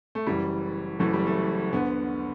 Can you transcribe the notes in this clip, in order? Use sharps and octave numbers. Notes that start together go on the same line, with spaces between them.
A3
F#1 F#2 E3 G3
F#1 F#2 E3 A3
G3
A3
D2 D3 B3